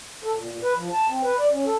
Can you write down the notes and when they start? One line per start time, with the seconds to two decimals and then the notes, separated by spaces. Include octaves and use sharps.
0.24 A4
0.35 A#2
0.48 A#2
0.63 B4
0.76 F3
0.92 A5
1.10 C4
1.23 B4
1.39 D5
1.52 C#4
1.66 A4